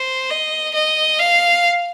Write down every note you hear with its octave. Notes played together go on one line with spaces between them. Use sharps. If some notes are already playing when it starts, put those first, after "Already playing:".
Already playing: C5
D#5
D#5
F5